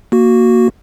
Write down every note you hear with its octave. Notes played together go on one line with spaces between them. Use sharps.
A#3 F#4